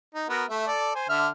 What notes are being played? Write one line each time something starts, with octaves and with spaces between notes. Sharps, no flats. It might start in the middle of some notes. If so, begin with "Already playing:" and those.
D#4
B3 F#4 A#4
A3 E5
A4 D5
C5 G#5
D3 E5 F6